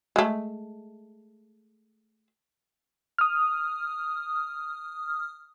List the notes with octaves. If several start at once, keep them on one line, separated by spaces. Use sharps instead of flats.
G#3 A3
D#6 F6